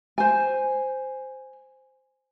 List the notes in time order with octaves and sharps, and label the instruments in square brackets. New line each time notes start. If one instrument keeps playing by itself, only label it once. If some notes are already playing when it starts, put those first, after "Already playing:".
[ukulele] C5 G#5